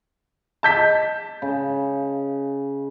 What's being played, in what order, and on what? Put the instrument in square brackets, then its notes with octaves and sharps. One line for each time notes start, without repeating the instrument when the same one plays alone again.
[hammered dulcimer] D#5 [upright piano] A5 G6 B6
[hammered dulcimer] C#3